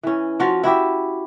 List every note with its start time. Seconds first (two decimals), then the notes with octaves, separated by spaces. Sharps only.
0.03 E3 C#4
0.40 F3 F4 F#4
0.64 E4 F#4 G4 E5